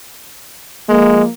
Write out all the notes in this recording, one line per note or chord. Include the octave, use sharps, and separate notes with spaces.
F3 G#3 A#3